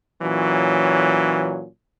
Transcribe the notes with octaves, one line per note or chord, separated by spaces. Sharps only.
A#2 E3 F#3 C#4